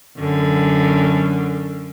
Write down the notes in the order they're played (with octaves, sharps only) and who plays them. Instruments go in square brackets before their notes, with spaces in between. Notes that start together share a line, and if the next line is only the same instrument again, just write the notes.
[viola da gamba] F#2 D3